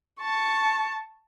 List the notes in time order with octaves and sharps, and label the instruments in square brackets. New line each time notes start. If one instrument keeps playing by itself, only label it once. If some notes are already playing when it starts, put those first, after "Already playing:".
[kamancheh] A5 C#6